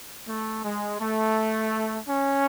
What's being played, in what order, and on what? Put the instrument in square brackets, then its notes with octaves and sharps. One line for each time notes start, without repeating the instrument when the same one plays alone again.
[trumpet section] A3
G#3
A3
C#4